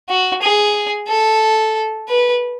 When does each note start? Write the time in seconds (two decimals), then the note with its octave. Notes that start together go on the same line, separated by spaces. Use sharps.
0.09 F#4
0.42 G#4
1.08 A4
2.08 B4